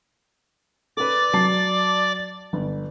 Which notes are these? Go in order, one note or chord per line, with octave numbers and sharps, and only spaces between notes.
A4 B4 D5 D6
F#3 A5 C7
G1